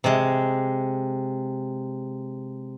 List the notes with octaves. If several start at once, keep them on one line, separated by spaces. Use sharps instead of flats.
C3 G#3